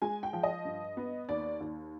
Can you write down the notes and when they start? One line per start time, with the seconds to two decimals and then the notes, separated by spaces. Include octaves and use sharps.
0.02 G#3 G#5
0.23 G5
0.33 F3
0.43 D#5
0.65 G2
0.97 B3
1.29 D#2 D5
1.60 D#2